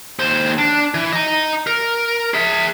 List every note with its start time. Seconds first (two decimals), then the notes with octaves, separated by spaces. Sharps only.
0.20 D#2 C5
0.59 D4
0.94 E3
1.13 D#5 A#5
1.67 A#4
2.34 G#4 E5